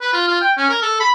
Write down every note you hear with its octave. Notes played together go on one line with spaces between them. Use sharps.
B4
F4
F4
G5
C#4
A#4
A4
B5